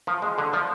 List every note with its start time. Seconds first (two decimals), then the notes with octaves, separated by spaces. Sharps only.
0.07 F3
0.22 G#3
0.38 D3
0.53 F3